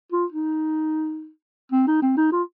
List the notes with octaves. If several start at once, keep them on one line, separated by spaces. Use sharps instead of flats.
F4
D#4
C4
D#4
C4
D#4
F4